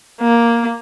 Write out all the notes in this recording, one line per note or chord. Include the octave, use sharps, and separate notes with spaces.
A#3